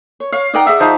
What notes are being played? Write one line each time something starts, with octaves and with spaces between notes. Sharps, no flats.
C#5
C#5 F5
D#4 B4 D5 F#5 G5 A#5
G#4 D#5 E5 F#5
F3 D#4 F5